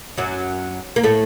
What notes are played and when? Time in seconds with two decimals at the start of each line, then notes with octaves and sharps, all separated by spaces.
0.17 F#2 F#3
0.96 A#3
1.03 A2 A3